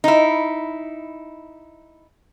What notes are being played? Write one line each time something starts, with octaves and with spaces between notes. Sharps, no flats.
D#4 E4